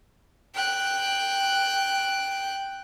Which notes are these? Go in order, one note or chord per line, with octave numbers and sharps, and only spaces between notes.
G5 F#6